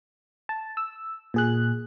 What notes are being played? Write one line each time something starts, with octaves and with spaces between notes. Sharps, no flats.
A5
E6
A#2 G#4 F#6